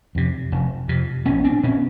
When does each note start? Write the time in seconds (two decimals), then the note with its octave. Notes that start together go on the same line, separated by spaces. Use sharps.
0.15 F2 C3
0.52 F1
0.88 F2 C3
1.26 A#1 B3 C#4
1.44 C4 D4
1.63 A#2 B3 C#4